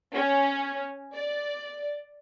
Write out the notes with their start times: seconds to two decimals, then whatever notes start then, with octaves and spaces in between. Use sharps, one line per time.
0.14 C#4
1.14 D5